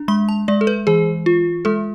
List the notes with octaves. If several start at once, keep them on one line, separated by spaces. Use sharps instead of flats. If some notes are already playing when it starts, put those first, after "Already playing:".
Already playing: D4
G#3 B5
A5
G#3 D5
A4
B4
E3 G#4
F4
G#3 A4